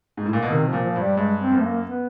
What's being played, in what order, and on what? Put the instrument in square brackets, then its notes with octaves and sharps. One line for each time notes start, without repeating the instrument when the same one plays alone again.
[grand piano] G#2
A2
A#2
B2
[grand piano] C3 [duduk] D#3
[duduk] F3
[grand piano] A#2
[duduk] F3
[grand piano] G2
[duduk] G3
[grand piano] G2 [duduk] G#3
[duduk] C4
[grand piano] F#2
[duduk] A3
A#3
B3